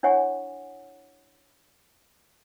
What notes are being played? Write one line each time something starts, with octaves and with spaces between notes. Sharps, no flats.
D4 E4 C#5 F#5 G#5 C#6